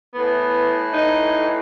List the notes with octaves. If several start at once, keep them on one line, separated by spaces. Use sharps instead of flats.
A2 E3 B3
D#4